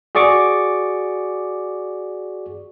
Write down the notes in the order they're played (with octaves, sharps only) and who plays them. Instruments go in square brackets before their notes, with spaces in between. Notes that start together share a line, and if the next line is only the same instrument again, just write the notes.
[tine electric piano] F#4 G#4 D5 C#6 D6